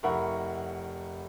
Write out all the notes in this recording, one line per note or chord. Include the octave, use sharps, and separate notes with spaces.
F1 E4 A#4 F#5 B5 C#6